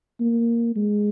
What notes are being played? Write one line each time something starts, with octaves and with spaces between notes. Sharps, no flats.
A#3
G#3